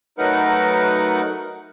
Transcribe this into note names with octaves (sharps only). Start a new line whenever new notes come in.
F#3 A3 D#4 A#4 B4 F#5